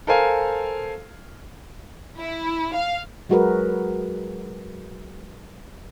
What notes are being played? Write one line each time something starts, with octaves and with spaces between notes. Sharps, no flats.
A4 A#4 C5 F5 G#5
E4
F5
F#3 G#3 F#4 G#4 A#4 B4